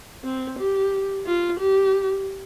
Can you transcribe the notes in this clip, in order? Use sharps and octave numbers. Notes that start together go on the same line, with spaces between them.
C4
G4
F4
G4